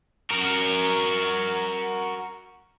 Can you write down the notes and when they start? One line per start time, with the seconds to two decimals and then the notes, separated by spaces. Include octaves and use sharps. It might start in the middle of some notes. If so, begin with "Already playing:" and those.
0.30 F#4 A#4